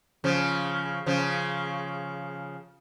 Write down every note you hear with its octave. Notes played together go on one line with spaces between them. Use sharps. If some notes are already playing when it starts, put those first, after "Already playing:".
C#3 F3
C#3 F3